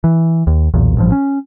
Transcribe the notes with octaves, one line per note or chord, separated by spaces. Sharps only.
E3
D#2
B1 E2 A#2
A1 G2 F3
C#4